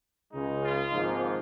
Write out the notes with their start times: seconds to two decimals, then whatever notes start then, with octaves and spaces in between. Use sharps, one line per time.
0.33 C#2 C#3 G#3 D#4
0.63 F4
0.92 G#1 G#2 F3 A#3 D#4